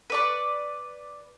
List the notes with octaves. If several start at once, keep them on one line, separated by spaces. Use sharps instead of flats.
B4 D5 C#6